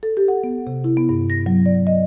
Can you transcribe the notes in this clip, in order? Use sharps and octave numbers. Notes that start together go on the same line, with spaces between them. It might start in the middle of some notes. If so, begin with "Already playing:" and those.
A4
G4
F#5
B3
C3
E4
B3
G2
A#6
F#3
D5
D#5